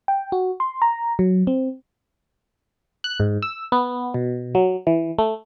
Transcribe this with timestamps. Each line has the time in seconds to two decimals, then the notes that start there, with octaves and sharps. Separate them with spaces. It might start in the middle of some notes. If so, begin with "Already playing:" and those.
0.08 G5
0.32 F#4
0.60 C6
0.82 A#5
1.19 F#3
1.47 C4
3.04 F#6
3.20 G#2
3.42 E6
3.72 B3
4.14 B2
4.55 F#3
4.87 E3
5.18 A3